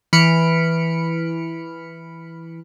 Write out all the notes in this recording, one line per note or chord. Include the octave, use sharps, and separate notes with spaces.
E3 B5 F6 C#7 D7